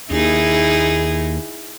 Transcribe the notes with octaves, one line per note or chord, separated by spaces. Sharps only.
D#2 D#4 E4 G#4